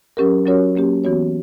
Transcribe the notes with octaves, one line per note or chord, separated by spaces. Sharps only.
F#3 C#4 G4 A#4
F#3 C#4 F#4 A#4 C#5
F#3 A#3 C#4 G4
E3 B3 F#4 C#5